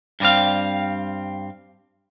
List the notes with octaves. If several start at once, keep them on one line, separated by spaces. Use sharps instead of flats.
G2 G3 C4 F5